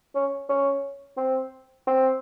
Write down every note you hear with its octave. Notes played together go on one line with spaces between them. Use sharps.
C#4
C#4
C4
C4